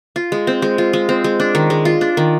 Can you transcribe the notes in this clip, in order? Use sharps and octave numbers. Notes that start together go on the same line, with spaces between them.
F4
G#3
C4
G#3
F4
G#3
C4
G#3
D4
D#3
G#3
F4
D4
D#3